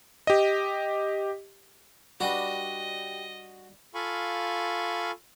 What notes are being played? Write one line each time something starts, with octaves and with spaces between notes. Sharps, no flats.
G4 D#5
G3 D4 F#4 G4 B4 D#5
F4 A4 F5 G#5 B5 C#6